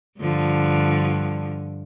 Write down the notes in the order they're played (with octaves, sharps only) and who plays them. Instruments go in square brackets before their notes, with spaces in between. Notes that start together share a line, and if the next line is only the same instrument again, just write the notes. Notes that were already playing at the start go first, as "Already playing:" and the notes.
[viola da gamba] G2 D3 F3